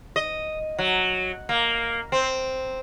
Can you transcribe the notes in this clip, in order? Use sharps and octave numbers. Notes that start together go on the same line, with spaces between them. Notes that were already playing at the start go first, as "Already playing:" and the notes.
D#5
F#3
A#3
C4